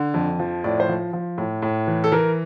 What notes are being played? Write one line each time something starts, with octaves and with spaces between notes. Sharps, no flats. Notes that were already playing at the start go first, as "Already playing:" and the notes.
Already playing: D3
F2
F3
A2 D5
C5
F3
F3
A2
A2
E3
A4
E3 A#4